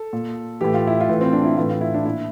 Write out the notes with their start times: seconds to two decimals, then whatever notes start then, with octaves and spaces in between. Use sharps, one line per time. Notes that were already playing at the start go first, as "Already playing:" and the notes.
Already playing: A4
0.13 A#2
0.61 A2 E3 G4
0.74 F4
0.87 E4
1.01 F4
1.09 A2 E3
1.21 C4
1.33 D4
1.44 E4
1.57 A2 E3 F4
1.70 F4
1.81 E4
1.94 D4
2.05 A#2 E4